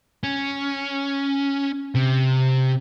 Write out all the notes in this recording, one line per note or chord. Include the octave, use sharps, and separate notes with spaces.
C#4
C3